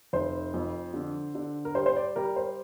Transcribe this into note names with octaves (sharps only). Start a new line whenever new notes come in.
F1 C5
F2
D3
D3
A#4
G3 C5
C5
D5
G3 A#4
C5